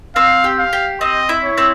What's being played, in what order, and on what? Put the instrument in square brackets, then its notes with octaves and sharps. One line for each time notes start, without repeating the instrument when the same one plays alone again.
[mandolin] C4 [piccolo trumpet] F5
[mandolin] G4
[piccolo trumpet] F5
[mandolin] G4
[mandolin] C4 [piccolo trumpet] D#5
[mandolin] E4
[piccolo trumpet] C#5
[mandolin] C4